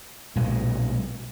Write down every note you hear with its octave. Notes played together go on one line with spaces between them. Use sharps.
B1 A#2 G#3